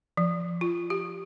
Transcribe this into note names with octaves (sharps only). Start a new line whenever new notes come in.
F3
F4
G4